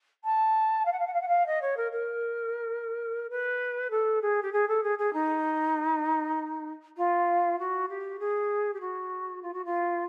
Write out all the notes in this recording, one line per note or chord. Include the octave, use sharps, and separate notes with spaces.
A5
F5
F#5
F5
F#5
F5
F#5
F5
D#5
C#5
A#4
A#4
B4
A4
G#4
G4
G#4
A4
G#4
G#4
D#4
F4
F#4
G4
G#4
G4
F#4
F4
F#4
F4